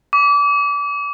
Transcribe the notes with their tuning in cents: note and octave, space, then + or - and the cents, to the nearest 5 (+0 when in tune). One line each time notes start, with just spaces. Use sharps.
D6 -30